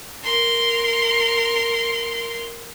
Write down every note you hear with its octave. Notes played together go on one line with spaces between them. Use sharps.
A#4 C6